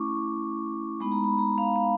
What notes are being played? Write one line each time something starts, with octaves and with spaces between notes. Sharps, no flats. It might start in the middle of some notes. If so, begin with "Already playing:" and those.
Already playing: A3 C#4 E4 C#6 D6
G#3 B3 D#4 B5
A#5
B5
A#5
F5
F5